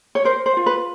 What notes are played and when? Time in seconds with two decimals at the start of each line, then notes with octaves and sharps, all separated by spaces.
0.15 C#5
0.25 A#4 C5
0.46 C5
0.57 F4
0.66 B4